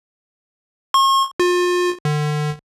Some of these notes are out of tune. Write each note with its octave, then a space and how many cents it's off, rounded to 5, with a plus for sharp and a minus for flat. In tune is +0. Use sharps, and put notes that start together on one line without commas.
C#6 -45
F4 +35
D3 +35